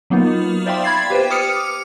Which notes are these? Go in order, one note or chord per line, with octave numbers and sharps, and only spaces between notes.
F#3 A#3 B3 D#4 F4
C5 D5 E5 F5 G5 C6
B5 G#6 A6 C7
G4 B4 C5 G5
D6 D#6 F6 C#7